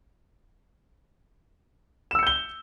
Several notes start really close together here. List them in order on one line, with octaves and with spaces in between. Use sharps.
E7 E6 C#7 G6 G7